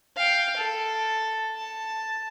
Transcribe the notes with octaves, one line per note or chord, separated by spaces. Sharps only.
F5 G5
A4
A5